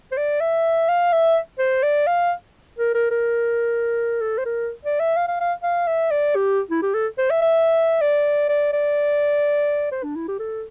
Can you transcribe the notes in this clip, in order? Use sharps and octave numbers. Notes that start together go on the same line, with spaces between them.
C5
D5
E5
F5
E5
C5
D5
F5
A#4
A#4
A#4
A4
C5
A#4
D5
E5
F5
F5
F5
F5
E5
D5
G4
E4
G4
A4
C5
E5
E5
D5
D5
D5
C5
D4
E4
G4
A4